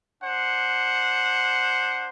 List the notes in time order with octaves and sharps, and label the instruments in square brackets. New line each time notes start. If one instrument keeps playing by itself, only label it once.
[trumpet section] D4 C5 F#5